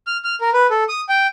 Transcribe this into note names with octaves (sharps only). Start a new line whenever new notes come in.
F6
F6
A#4
B4
A4
D#6
G5